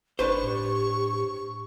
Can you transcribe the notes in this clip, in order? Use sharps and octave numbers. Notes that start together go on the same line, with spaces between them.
G1 D4 B4 C5 C#6
A2 G4